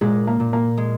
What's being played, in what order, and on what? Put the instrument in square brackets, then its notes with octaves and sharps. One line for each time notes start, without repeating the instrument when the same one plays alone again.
[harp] A#2 [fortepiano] G#3
[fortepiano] A#3
[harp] A#2
[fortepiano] A#3
[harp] G#3